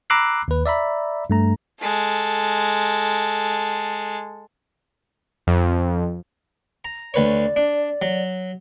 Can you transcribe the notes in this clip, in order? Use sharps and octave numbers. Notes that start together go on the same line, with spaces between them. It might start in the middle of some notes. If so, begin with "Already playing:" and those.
A#5 B5 D6 E6 F#6 C7
D#2 B4
D5 E5 A#5 B5
G2 A3 A#5
G#3 A4
F2
A#5
D2 B4 C#5 D5
D4
F#3